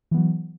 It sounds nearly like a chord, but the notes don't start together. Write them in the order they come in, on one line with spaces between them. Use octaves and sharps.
E3 B3 F#3